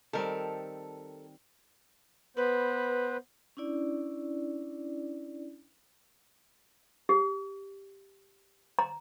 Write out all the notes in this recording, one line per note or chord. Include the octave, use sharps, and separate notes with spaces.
D#3 G3 C4 A4 A#4
B3 B4 C5
C#4 D4 E4 D5
G4
A#5